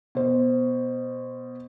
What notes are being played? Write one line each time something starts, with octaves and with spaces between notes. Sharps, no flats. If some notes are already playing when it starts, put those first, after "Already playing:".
B2 C5